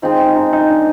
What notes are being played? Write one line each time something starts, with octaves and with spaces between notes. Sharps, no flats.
G#3 C4 D#4 F4
D#4
D#4
D#4
D4